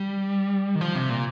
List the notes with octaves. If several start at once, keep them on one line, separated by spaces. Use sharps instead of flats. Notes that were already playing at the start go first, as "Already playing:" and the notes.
Already playing: G3
D#3
F3
C3
A#2